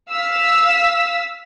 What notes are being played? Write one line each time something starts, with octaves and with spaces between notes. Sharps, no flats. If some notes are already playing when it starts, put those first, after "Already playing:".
F5 E6 B6